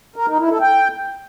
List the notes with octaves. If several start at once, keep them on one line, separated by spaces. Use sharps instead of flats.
A#4
D#4
E4
A4
G5